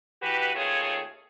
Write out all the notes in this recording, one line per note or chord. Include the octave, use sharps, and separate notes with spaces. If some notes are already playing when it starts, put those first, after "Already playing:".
E3 F#4 G4 B4
D#2 A3 C4 F4 G#4 C#5